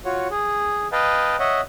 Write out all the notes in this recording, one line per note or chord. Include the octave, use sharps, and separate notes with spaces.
F4 F#4 C#5
G#4
B4 D#5 F5 G5 A5
C#5 D#5 E5 F#5